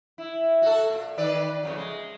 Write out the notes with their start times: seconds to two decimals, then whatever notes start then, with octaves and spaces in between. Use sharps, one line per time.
0.18 E4
0.62 F#4 A4
0.90 A#2
1.18 D#3 B4 D5
1.63 F2 C#3 F#3
1.75 G#3